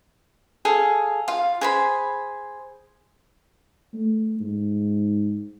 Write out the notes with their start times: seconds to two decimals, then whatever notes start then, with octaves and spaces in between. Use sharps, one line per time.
0.65 G#4 A4 F5
1.28 F4 F5
1.61 G#4 C5 B5
3.94 A3
4.40 G#2